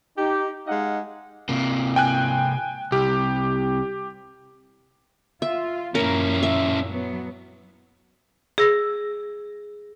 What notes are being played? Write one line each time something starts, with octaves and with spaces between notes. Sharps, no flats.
D#4 G4
G#3 D#4 D#5 F5 F#5
C3 A#3
G5 G#5 F#6
C2 G4
F4 E5
F#2 A#2 A#3 C#4 E4 A#4
E5
F#3 B3
G#4 E6 A#6